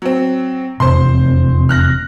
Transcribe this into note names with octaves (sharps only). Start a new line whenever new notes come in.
F#3 C4
E1 F2 C3 C5 C6
F6 F#6 A#6